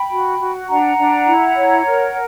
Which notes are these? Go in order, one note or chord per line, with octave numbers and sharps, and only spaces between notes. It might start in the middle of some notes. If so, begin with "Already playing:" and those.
Already playing: G5 B5
F#4
F#4
D4 F#5 A#5
D4
E4
C#5
A#4